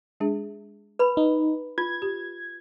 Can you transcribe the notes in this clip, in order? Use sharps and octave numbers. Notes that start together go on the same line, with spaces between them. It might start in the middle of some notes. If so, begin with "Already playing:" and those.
G#3 D4 G#4
B4 B5
D#4
F4 G#6
G4